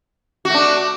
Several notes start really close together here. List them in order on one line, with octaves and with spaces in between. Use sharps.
F#4 A3 D4